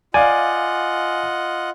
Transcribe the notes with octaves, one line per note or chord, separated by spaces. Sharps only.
F4 D5 D#5 F5 F#5 G#5